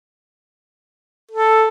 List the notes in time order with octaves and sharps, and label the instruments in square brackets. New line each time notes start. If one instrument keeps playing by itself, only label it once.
[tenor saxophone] A4